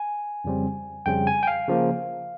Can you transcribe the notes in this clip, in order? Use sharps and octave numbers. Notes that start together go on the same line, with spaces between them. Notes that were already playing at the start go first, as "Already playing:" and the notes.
Already playing: G#5
F2 C#3 G3 C4
F2 C#3 G3 C4 G5
G#5
G5
F5
C#3 F3 A#3